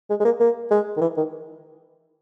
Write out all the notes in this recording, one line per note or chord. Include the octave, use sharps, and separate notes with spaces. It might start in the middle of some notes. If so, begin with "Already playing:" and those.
G#3
G#3
A#3
A#3
G#3
D#3
E3
D#3